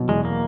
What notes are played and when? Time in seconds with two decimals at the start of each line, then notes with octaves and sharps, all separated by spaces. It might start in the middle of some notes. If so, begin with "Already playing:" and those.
Already playing: B2 F#3
0.08 E2 G#3
0.25 A#3